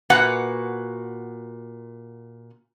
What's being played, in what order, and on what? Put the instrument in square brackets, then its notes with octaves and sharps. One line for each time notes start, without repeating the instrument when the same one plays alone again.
[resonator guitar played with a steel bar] A#2 F#4 B4 F#5